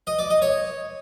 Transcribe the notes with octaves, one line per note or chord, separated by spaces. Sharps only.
D#5
D5
D#5
C#5